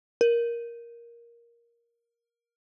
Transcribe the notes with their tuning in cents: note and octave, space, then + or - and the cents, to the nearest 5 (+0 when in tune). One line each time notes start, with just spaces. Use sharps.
A#4 +10